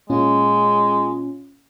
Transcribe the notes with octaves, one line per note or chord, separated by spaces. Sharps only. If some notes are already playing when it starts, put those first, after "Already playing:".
A#2 G#3 C#4 F4